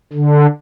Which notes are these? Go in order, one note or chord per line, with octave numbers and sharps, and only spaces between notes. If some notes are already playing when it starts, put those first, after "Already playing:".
D3